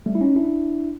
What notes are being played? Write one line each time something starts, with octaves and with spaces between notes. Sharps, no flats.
G3 A3
E4
C#4 D#4
D4 E4